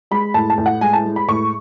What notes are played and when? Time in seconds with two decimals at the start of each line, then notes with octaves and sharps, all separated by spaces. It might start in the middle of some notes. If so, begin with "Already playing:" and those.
0.11 G#3 B5
0.34 A2 A5
0.50 A5
0.58 A2
0.66 F#5
0.81 G#3 G#5
0.93 A5
1.05 G#3
1.16 B5
1.28 A2 C#6